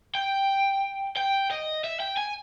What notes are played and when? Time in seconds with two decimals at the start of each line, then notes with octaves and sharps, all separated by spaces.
0.15 G5
1.17 G5
1.51 D#5
1.84 E5
2.00 G5
2.17 G#5